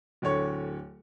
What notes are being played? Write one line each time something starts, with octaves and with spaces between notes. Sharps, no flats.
D1 D3 C#5 C#6